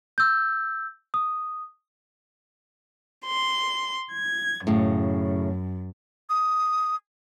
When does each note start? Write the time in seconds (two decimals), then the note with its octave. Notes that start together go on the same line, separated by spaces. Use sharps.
0.18 E6 G6
1.14 D#6
3.25 C6
4.13 G#6
4.67 F#2 A2 C#3
6.30 D#6